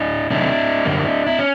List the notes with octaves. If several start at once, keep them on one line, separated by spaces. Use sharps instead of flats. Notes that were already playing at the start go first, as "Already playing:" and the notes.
Already playing: D4 E4
C3 D#3 F#3 A3 D4 E4
F#2 D3 G3 A#3
E4
C#4